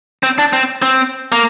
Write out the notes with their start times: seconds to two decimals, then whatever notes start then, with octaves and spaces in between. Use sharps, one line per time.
0.23 C4
0.38 D4
0.53 C4
0.82 C4
1.32 A#3